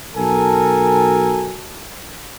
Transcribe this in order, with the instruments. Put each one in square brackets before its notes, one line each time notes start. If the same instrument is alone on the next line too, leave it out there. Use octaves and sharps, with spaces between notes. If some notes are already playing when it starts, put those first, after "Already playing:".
[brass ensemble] B1 F#4 A4 A#4 G#5 A5